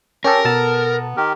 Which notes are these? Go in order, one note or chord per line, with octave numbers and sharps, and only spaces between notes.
C#4 G4 A4 A#4
B2 B3 A4 A5 A#5
D#3 G4 A#4